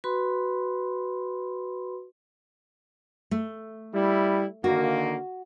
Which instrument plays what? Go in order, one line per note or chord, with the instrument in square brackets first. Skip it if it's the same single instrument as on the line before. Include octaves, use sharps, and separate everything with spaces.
[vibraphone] F#4 B4 B5 C6
[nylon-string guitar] A3
[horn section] G3 E4
[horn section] D3 D#3 A#3 [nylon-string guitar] F#4